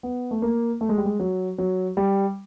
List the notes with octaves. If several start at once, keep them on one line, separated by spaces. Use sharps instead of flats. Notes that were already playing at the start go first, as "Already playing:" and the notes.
B3
A3
A#3
A3
G#3
G3
G#3
F#3
F#3
G3